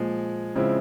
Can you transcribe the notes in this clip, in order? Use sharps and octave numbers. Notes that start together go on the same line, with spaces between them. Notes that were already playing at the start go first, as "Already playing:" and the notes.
Already playing: A#2 F3 G#3
C#3 F3 G#3 C4 E4